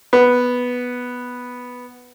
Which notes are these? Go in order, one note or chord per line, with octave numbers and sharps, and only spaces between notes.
B3